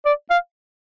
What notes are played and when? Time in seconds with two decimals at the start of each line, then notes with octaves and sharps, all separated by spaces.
0.06 D5
0.30 F5